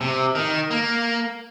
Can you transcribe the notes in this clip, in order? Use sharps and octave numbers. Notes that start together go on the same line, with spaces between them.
C3
D#3
A#3